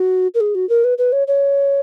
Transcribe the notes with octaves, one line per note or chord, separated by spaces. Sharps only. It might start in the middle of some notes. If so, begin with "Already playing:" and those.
Already playing: F#4
A#4
G#4
F#4
A#4
B4
B4
C#5
C#5